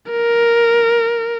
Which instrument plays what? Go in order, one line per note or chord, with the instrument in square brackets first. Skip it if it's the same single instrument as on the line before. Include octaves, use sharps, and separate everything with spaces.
[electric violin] A#4